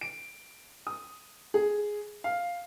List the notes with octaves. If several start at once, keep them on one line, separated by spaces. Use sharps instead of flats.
D7
D#6
G#4
F5